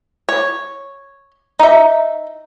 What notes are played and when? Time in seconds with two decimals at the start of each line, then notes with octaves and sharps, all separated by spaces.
0.29 C#5
1.59 D#4 E5